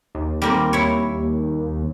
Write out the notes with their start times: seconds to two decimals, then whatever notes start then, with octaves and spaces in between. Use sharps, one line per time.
0.15 D#2
0.42 G3 A#3 C4
0.73 E4 C#5